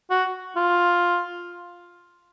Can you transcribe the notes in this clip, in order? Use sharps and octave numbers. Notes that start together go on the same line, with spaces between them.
F#4
F4